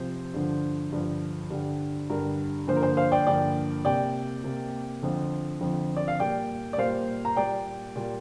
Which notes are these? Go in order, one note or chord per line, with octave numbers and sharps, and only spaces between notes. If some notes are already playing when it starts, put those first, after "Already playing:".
Already playing: C3 F3 C4 C5
G2 D3 F3
G2 D3 F3
G2 D3 G3
G2 D3 G3 A#4
G2 D3 F3 A#3 C5
A#4
C5
C5 F5
D5 G5
G2 D3 F3 A#3 D5 G5
C3 A#3 D5 G5
C3 A#3
F2 D3 F3 C4
F2 D3 F3 C4
D5
F5
A#2 G3 A#3 D5 G5
D5
A#2 G3 A#3 C5 F5
A#5
A#2 G3 A#3 D5 G5
A#2 G3 A#3